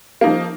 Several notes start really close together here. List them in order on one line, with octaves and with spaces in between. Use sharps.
A#3 D#4 F3